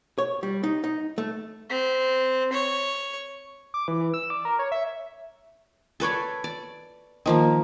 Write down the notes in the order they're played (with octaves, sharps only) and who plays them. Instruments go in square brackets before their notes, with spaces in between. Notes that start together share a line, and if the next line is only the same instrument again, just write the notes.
[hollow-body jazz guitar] C#5
G3
D#4
D#4
A3
[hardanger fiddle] C4
C#5
[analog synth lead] D6
E3
E3
E6
D5
A#4
C#5
E5
[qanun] A4 B4 C#5 D5
D5
D#3 F3 A#3